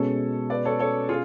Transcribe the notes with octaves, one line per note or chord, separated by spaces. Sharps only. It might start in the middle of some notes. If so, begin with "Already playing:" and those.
Already playing: B2 G#3 C#4 A4 C#5
B4 D5
A4 C#5
A4 C#5
F4 G#4